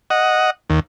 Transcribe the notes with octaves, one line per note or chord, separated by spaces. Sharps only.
D#5 F#5
D#2